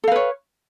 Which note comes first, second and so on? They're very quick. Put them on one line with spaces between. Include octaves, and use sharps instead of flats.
A4 F5 B4 C#5